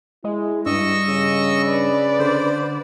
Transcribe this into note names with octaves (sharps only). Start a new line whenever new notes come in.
G#3 E4
G2 D#5 C#6 E6
C#3
B4 D5
D3 C5